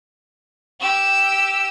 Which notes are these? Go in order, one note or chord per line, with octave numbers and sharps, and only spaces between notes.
G4 E6